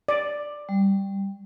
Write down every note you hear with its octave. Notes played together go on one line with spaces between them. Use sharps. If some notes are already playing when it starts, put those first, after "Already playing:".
D5
G3